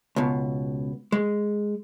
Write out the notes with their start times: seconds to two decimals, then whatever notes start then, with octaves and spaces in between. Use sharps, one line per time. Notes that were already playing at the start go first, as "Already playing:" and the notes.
0.16 C#2 B2
1.12 G#3